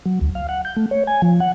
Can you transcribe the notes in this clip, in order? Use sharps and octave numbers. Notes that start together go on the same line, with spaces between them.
F#3
D2
F5
F#5
G6
A3
C#5
G#5
F3
F#5